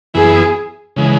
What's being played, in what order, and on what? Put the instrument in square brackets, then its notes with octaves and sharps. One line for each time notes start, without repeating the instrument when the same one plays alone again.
[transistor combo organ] F#2 E3 B3 E4 [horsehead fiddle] G#4
[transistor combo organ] C#3 E3 G#3